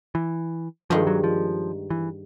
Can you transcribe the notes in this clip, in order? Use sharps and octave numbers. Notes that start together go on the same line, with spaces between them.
E3
G2 D#3 F3 G#3
F#3
F3
E3